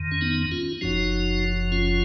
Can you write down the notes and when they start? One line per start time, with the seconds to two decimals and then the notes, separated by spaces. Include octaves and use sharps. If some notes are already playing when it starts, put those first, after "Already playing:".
Already playing: F2 D#3
0.11 C#4
0.21 B3 D#4
0.52 C#4 F4
0.81 F#1 F#2 F3 D#4 F#4
1.72 C#4 F4